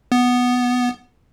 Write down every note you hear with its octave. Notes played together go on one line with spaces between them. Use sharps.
B3